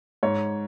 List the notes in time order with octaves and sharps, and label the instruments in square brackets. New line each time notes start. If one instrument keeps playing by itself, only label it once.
[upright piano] G#2 C#5